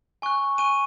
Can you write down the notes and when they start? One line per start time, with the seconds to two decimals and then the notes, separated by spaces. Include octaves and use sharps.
0.22 G#5 C#6 F#6
0.58 G#5 C#6 F#6 D#7